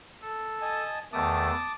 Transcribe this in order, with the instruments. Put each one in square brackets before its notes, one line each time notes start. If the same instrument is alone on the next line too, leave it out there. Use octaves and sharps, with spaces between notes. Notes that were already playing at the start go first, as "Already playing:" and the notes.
[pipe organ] A4
[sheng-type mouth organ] D#5 G#5 A5
[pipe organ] E2 D#3 A3 [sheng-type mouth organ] A5 D6 D#6